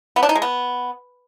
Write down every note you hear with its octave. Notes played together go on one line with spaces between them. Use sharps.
B3
D4
D#4
G#3
B3